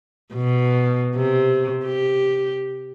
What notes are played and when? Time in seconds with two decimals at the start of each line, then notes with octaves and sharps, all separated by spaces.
0.34 B2
1.16 C3
1.86 G4